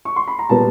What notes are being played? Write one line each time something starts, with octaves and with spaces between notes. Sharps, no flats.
C#6
C6
B5
A#5
A#2 G3 B3 A5